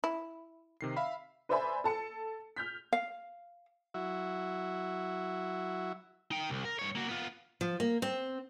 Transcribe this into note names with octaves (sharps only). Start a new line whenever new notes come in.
E4
C3 D#3 C7
E5 F5 B5
B4 C5 D5 E5 G#5 B5
A4 A5 C#7
F6 G6 B6
F5
F#3 E4 F#4 E5
D#4 G5
C2
A#4
G2 C#5
A#3 F#4
B3 F4
F3
A#3
C4